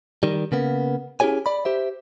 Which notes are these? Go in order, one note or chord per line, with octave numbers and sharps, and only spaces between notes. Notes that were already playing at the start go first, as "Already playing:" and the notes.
D#3 G3
C#3 A#3 B3
C#4 E4 G4 G#4 C#5 G#5
D5 B5
G4 C5 E5